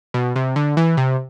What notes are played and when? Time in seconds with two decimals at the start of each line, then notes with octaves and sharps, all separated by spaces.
0.14 B2
0.36 C3
0.56 D3
0.77 E3
0.97 C3